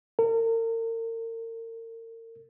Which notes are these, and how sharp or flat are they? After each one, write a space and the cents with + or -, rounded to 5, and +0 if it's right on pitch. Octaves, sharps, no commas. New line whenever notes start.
A#4 -40